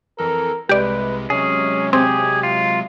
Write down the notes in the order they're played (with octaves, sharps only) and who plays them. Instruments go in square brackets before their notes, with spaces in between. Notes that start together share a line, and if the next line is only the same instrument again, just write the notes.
[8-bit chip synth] F2 E3 A4 [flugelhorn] A#4
[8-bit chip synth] C2 C3 G#3 [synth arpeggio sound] G4 D5 [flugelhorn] B4
[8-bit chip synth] C3 F#3 G#3 [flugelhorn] C#4 [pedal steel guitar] G#4
[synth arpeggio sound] C4 [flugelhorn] G4 [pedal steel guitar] G#4
[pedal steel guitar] F4